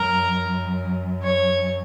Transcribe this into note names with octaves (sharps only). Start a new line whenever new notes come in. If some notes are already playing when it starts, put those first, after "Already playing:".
Already playing: F#2 A#4
C#5